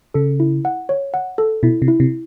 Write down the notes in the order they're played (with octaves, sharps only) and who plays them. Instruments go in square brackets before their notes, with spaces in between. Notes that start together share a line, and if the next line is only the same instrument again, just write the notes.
[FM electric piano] C#3 [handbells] A4
[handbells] E4
F#5
C#5
F#5
A4
[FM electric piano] B2 [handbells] E4
[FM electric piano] C3
[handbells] E4
[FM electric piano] C3